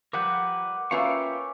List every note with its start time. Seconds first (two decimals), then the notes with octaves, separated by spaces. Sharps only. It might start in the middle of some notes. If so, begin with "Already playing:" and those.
0.13 F3 G3 A#4 B4 F#5 D6 G6
0.91 A#3 C#4 F4 B4 E5 F5 G5 C#6